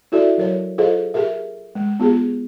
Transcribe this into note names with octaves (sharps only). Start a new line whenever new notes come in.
E4 F#4 A4 D5 E5
F#3 A#4 C#5
F4 G#4 A4 C5 D#5 F5
G4 G#4 A#4 E5
G#3
B3 F4 G4 G#4